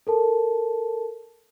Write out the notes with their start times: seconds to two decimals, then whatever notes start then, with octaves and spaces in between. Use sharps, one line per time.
0.07 A4 A#4 A5